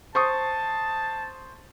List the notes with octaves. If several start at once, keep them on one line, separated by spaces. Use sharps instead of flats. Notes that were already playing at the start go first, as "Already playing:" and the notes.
C5 A5 C#6 D#6